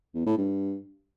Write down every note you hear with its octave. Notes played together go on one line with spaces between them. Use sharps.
E2
A2
G2